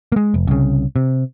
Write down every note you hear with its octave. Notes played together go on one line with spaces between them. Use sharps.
G#3 A#3
F1
C2 C#3
C3